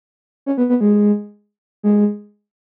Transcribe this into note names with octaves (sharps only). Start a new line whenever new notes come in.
C#4
B3
B3
G#3
G#3